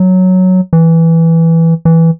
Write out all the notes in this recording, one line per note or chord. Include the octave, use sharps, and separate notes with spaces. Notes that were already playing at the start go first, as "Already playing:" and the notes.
Already playing: F#3
E3
E3